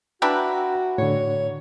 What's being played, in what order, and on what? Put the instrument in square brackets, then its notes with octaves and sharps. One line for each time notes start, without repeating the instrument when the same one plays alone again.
[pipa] D4 E4 B4 [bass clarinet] F#4 [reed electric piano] G5 A#5 B5
[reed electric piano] A2 D3 [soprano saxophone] C#5